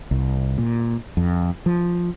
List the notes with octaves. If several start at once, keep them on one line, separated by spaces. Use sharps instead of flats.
C2
A#2
F2
F3